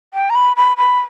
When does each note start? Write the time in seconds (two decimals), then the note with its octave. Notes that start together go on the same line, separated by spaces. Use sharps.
0.14 G5
0.30 A#5
0.35 B5
0.57 B5
0.77 B5